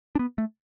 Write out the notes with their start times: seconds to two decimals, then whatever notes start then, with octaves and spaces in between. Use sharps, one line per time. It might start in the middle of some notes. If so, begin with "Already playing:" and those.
0.15 D4
0.19 B3
0.38 A3